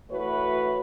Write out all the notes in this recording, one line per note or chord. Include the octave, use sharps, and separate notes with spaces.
E3 A3 F#4 B4 C#5